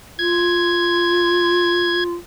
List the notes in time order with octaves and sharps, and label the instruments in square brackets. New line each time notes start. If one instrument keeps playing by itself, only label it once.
[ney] F4 [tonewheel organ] G#6